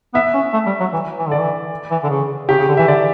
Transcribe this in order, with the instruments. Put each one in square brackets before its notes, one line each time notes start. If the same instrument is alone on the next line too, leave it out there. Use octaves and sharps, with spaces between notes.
[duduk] B3 [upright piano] E5
[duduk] C#4
A3
G3
F#3
E3
E3
[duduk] D3 [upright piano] D5
[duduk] E3
E3
D3
C#3
[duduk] C#3 [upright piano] G4
[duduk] C#3
D3
[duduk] E3 [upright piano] E5
[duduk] D3 [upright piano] D5